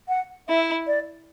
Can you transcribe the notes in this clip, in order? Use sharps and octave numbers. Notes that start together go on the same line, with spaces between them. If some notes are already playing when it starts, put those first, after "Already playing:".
F#5
E4 E5
D5